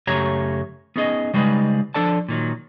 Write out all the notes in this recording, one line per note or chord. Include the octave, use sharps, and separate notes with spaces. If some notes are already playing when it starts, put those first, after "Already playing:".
F#2 C#3 A3 G4 C#5 A#5
B3 C#4 D#4 G#4 D#5
C#3 G3 G#3 D#4 B4
F3 D4 A4 D5 A5
A#2 D#3 F#3